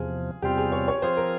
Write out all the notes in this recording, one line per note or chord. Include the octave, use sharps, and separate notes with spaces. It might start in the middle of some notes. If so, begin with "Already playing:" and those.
Already playing: E2 C3 F3 G#4
E2 C3 G3 C4 F4 G4
G#4
C#5
C#5
F3 C4 F4 G#4 C5
A#4